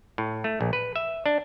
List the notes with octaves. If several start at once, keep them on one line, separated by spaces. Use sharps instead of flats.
A2
A3
A#1
B4
E5
D4